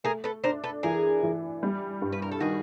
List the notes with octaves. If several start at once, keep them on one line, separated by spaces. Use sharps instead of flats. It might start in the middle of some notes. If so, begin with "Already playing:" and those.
A3 G#4 A#4
A4 B4
D4 A#4 C5
A4 B4
E3 G#4 A#4
E3
G3
G2
B4
A#4
A4
D#3 F#4 G#4